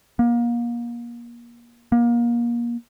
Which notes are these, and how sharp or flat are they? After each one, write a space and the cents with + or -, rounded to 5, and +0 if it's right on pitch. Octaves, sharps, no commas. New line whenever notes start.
A#3 +30
A#3 +30